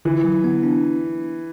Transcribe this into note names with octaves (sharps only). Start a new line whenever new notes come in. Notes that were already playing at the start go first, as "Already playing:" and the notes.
D3 E3
F#3
B3
D4